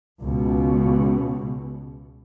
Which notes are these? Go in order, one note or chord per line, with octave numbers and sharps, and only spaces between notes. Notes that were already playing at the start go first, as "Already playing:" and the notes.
C#2 B2